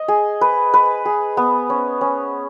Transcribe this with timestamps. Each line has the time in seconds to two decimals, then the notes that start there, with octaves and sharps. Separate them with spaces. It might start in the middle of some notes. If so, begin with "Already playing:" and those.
Already playing: D#5
0.08 G#4
0.41 B4
0.74 B4
1.05 G#4
1.37 B3
1.70 C#4
2.01 C#4